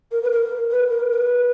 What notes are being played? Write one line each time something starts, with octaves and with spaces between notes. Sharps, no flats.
A#4
B4
A#4
B4
A#4
B4